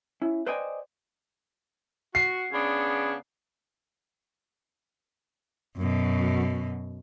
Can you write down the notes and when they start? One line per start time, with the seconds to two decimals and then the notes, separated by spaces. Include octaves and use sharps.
0.22 C#4 E4
0.46 B4 C5 D5 D#5 G5 G#5
2.15 F#4 C7
2.52 C#3 B3 D4
5.77 F#2 B2